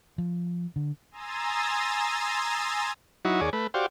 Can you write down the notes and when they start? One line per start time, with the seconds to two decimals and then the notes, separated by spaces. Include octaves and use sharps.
0.18 F3
0.76 D3
1.11 G#5 A#5 C6 D#6 E6 A6
3.25 F#3 D#4 E4 F#4
3.41 D#2 G#4 C#5 D5
3.53 A3 B4
3.74 F#4 G4 C5 D5 F5